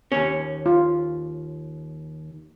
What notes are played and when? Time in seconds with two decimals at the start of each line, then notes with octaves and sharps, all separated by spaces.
0.12 D#2 C#4
0.66 F4